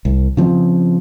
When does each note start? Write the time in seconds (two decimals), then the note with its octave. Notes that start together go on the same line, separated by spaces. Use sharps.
0.05 C2
0.37 C#3 F3 C4